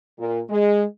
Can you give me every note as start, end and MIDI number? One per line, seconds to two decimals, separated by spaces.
0.19 0.40 46
0.50 0.83 56